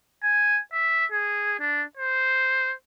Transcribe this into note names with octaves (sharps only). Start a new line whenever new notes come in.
G#5
E5
G#4
D4
C5